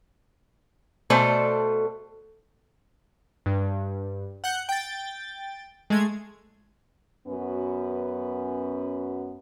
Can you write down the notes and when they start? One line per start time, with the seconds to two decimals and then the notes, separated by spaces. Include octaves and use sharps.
1.10 B2 A3 A4 C5 D5
3.46 G2
4.44 F#5 F#6 G6 C#7
4.69 G5 A6
5.90 G#3 A3 G#6
7.27 F#2 B3 C#4 F#4 B4